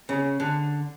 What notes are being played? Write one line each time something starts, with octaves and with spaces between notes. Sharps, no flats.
C#3
D3